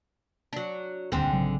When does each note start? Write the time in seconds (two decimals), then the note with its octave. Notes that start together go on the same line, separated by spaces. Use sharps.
0.53 F#3 D4
1.12 D#1 D2 G#2 D3 C4
1.32 A#1 C#3 F#3